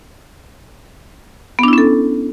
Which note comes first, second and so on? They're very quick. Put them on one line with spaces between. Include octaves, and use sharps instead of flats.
B3 D4 E4 C#4 A4